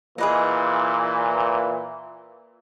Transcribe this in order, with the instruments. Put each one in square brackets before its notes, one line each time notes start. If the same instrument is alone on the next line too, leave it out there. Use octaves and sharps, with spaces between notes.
[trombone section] A#2 E3 [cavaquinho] G#4 B4 D#5